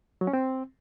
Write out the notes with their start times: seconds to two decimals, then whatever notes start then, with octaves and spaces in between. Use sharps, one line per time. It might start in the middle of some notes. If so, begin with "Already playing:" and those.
0.21 F#3
0.27 C#4
0.33 C4